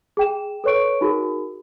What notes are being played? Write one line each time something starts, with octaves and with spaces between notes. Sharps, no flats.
G#4 G5 E7
A4 B4 C#5 C#6 D7
D#4 F#4 G#4 A#4